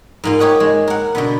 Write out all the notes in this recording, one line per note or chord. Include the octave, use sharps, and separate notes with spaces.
G#2 A#3 F4
G4 C#5 D#5 F#5
G#3
A#4 F#5
B2 D3 B3